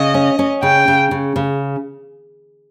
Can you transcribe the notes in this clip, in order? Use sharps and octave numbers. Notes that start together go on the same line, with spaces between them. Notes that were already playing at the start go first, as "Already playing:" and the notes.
Already playing: C#3 D#5
C#4
C#4
C#3 G5
C#3
C#3
C#3